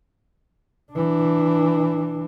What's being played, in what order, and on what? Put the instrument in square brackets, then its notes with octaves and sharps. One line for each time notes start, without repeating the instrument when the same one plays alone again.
[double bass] E3 D4